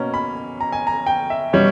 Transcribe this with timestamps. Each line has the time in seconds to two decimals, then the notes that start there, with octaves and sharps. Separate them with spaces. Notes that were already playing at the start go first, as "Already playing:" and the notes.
Already playing: B2 A#3 C#4
0.14 B5
0.61 A#5
0.72 G#5
0.87 A#5
1.06 G5
1.30 E5
1.53 B2 G3 C#4 C#5